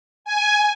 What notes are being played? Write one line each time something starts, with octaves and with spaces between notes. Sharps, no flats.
G#5